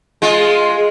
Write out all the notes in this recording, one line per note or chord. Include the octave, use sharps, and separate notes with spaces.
G#3 F4